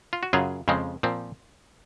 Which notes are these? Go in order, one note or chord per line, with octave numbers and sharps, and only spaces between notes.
F4
F#4
F#2 C#3 F#3 F4 G#4
F2 C#3 F3 G#3 C4
A#2 F3 C4